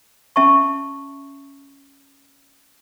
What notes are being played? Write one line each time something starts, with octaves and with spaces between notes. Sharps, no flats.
C#4 E5 A5 C#6